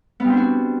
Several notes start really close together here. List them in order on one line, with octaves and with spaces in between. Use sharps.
B3 G3 C4 D4 F#4